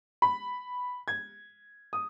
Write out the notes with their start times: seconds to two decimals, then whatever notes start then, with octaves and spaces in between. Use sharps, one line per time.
0.22 B5
1.08 G#6
1.93 D#6